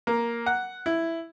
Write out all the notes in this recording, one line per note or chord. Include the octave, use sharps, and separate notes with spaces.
A#3
F#5
E4